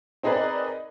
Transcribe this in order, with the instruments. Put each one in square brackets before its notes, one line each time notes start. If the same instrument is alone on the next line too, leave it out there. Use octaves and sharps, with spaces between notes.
[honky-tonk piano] C4 D#4 G#4 A#4 B4 D5